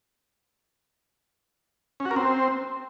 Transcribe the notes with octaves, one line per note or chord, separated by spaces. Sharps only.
C#4
F#4
A#4
C4